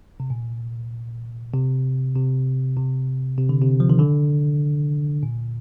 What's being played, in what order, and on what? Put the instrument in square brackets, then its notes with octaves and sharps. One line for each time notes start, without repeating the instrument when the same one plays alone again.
[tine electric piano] C3
A#2
C3
C3
C3
C3
D3
C3
F3
D#3
D3
A#2